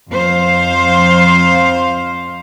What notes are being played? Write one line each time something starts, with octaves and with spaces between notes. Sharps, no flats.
F2 C5 F5